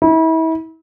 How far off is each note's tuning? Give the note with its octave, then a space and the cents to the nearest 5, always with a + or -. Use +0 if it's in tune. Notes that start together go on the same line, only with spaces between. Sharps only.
E4 -35